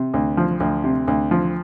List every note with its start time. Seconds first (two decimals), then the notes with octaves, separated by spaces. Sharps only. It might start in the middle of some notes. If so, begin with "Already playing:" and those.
Already playing: C3
0.14 D2
0.37 F3
0.60 D2
0.84 C3
1.07 D2
1.31 F3